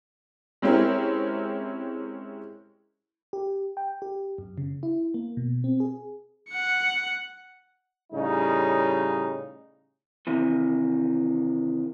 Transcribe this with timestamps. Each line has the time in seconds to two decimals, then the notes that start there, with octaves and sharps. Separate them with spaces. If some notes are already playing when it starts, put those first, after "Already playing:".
0.62 G#3 C4 C#4 E4 G4 A#4
3.33 G4
3.77 G5
4.02 G4
4.38 F#2
4.58 C#3
4.83 E4
5.14 A#3
5.37 B2
5.64 C4
5.80 G#4
6.49 F#5 C#7
8.13 A2 C#3 G3 D#4
10.27 C3 D#3 E3